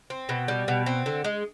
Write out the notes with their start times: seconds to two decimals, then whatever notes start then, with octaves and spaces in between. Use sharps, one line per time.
0.10 C4
0.29 B2
0.48 G3
0.68 B2
0.86 C4
1.06 D3
1.24 G#3